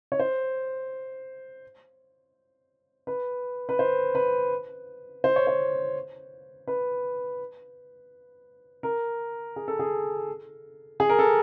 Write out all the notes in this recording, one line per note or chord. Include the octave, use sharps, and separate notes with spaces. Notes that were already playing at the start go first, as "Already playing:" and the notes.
C#5
C5
B4
B4
C5
B4
C5
C#5
C5
B4
A#4
G#4
A4
G#4
G#4
A#4
A4